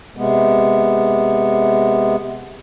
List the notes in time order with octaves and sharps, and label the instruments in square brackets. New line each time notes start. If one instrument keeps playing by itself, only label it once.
[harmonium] C3 G#3 B3